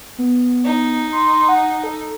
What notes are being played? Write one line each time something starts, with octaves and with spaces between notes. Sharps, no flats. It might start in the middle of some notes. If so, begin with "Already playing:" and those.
B3
D#4
C6
F#5
A4